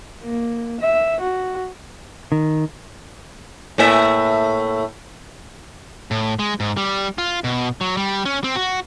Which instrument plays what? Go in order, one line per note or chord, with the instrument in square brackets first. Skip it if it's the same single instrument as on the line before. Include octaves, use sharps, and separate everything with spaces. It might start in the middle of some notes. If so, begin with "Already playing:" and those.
[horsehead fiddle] A#3
E5
F#4
[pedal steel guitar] D#3
[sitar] A2 A#3 E5
[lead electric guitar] A2
G#3
G#2
G3
F4
B2
F#3
G3
C#4
C4
F#4